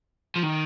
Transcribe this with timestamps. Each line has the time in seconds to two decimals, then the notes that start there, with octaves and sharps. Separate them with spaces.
0.36 F3
0.43 D#3